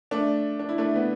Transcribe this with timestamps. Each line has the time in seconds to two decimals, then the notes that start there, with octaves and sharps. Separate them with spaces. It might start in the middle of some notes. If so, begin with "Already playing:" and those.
0.11 A3 D4
0.59 D4
0.69 E4
0.78 A3 D4
0.95 B3